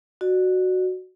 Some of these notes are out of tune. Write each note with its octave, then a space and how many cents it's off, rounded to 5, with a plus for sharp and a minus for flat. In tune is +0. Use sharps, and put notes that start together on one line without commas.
F#4 +0 D5 +40